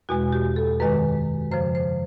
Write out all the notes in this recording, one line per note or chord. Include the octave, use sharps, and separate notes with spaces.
E2 B2 G#3 F#4
G4
A4
F#2 D#3 G#3 B4
F#2 C#3 F3 C5
C5